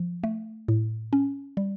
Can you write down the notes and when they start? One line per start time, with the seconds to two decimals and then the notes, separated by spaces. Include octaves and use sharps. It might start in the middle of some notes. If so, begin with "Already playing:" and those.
Already playing: F3
0.24 A3
0.68 A2
1.13 C#4
1.57 G3